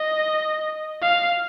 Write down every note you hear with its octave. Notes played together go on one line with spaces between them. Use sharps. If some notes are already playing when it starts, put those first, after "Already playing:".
Already playing: D#5
F5